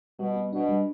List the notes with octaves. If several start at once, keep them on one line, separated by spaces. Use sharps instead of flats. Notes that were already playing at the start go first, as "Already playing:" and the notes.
B2 G3
B3
B2 D4
G3